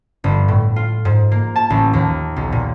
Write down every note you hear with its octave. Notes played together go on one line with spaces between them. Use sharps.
G1
A2
F4
G#2
A#3
A5
A1
D#2
B1
A#2